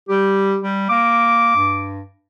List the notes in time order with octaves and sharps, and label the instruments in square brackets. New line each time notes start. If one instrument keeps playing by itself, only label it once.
[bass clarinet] G3 [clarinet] G4
[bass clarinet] G3
[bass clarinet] A#3 [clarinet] D6
[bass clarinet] G2